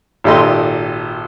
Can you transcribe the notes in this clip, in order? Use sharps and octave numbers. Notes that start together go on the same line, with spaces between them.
G#1 A#2 G4 A4 D#5 C6